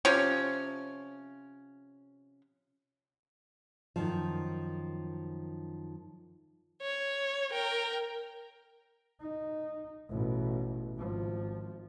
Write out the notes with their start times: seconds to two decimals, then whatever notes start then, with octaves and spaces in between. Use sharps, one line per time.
0.05 C3 F3 C#4
3.96 F#2 D#3 F3
6.82 C#5
7.52 A#4 G5
9.21 D#4
10.09 A1 B2
10.96 G#1 F3